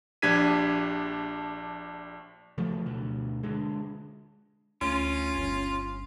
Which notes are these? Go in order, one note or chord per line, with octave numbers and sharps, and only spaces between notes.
A#1 D4 G4 G#6 B6 D#7
C#3 F3 F#3 A3
D2 B2
D3 G#3
D2 C#4 F4
G1